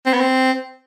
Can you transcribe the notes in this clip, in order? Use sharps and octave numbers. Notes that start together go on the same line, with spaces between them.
C4
B3
C4